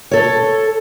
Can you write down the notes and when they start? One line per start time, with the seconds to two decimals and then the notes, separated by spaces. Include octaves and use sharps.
0.11 A4 C#5